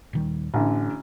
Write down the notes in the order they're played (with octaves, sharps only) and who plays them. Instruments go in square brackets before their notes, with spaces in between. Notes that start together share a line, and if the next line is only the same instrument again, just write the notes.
[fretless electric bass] D#1 D#3 G3
[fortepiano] A1 D3 [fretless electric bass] A2